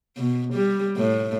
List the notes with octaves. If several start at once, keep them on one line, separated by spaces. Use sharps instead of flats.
B2
G3
A2